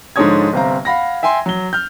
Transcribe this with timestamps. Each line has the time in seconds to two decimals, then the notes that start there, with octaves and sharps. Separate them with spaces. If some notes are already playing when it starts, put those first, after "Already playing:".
0.16 G#2 D3 F3 C#5 D#6 G#6
0.53 G1 C3 C4 F5 A#5
0.85 F5 F#5 B5 A#6
1.23 E5 G5 G#5 C6
1.46 F#3 G7
1.73 F6 G6